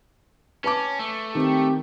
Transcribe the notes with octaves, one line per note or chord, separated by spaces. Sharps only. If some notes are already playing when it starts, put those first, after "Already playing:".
C#4 B4 A5 D6
A3
D#3 C4 G4